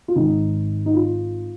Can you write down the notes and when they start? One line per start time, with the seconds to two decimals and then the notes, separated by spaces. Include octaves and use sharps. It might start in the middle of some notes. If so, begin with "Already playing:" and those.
0.08 F4
0.15 G#1 G#2 D#3 D#4
0.86 D#4
0.94 F4